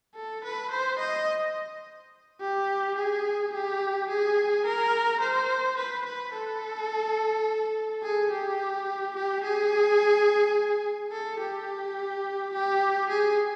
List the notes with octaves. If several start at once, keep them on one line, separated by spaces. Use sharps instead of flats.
A4
B4
C5
D#5
G4
G#4
G4
G#4
A#4
C5
B4
B4
A4
G#4
G4
G4
G#4
A4
G4
G4
G#4